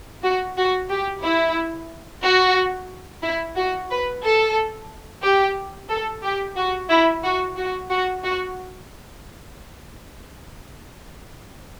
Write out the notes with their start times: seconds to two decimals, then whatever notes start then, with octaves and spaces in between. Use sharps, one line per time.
0.23 F#4
0.57 F#4
0.89 G4
1.23 E4
2.24 F#4
3.23 E4
3.56 F#4
3.90 B4
4.23 A4
5.23 G4
5.89 A4
6.23 G4
6.56 F#4
6.89 E4
7.23 F#4
7.57 F#4
7.90 F#4
8.24 F#4